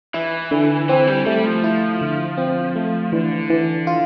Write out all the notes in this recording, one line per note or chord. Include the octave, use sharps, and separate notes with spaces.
E3 E4
D3
E3 C4
G3
G3 A3
F3
E4
D3
C4
A3
D3 E3
E3
F4